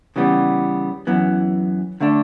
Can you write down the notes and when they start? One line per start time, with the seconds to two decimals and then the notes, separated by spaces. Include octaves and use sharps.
0.16 C#3 E3 G3 B3
1.07 F#2 E3 B3
2.01 D3 A3 D4